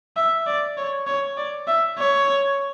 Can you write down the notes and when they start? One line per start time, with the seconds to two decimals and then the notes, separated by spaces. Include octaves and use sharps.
0.17 E5
0.47 D5
0.77 C#5
1.07 C#5
1.37 D5
1.67 E5
1.98 C#5